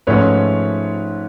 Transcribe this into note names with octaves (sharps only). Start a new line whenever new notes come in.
G#2 F3 A3 C#4 B4 C#5